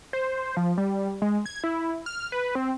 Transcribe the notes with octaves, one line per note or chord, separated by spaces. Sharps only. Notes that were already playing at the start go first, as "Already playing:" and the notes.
C5
F3
G3
G#3
G#6
E4
F6
B4
C4